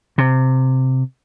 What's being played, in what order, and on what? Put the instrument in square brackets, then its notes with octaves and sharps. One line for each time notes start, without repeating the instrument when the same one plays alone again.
[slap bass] C3